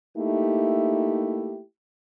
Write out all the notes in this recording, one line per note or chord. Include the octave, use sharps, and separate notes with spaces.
A3 A#3 D#4 E4 G4